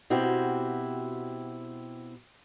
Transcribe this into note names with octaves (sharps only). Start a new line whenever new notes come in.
B2 C4 E4 F#4 G4